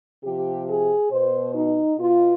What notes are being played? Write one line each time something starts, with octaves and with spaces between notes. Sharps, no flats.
C3 F3 G4
G#4
B2 C5
D#4
B2 F4